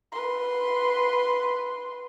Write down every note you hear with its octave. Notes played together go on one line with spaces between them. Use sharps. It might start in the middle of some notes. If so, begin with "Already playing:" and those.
B4 C6